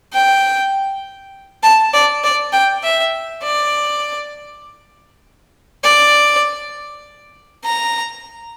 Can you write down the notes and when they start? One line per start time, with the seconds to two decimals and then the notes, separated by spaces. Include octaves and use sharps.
0.13 G5
1.63 A5
1.93 D5
2.24 D5
2.53 G5
2.84 E5
3.43 D5
5.84 D5
7.64 A#5